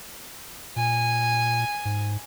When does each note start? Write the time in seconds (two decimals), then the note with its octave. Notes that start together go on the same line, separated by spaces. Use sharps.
0.76 A#2 G#5
1.85 G#2